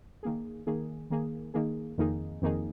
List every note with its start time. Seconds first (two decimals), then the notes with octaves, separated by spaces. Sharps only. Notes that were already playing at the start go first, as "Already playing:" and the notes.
0.23 D#3 A#3 G#4
0.67 D#3 A#3 G#4
1.10 D#3 A#3 G#4
1.54 D#3 A#3 G#4
1.98 F2 D#3 A#3 D#4 G#4
2.42 F2 D#3 A#3 D#4 G#4